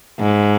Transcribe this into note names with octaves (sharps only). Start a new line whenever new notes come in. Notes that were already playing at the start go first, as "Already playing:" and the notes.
G#2